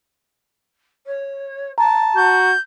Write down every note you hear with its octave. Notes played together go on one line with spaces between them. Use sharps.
C#5
A5 A#5
F#4 G6